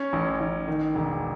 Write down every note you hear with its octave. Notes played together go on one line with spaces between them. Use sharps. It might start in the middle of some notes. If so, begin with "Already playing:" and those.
Already playing: C#4
A1
A1
D#3
E1